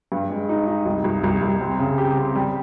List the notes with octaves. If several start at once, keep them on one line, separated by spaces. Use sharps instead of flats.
G2
G#3
D#4
D#4
C2
C2
C2
C2
C4
C#3
G4
C4
G3